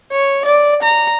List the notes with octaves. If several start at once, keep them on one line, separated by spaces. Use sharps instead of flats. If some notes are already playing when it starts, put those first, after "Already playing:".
C#5
D5
A#5